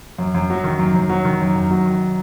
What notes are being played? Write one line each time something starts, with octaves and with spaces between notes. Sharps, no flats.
F#2
F#2
F#3
D#3
F#2
F#2
F#3
D#3
F#2
F#2
F#3
D#3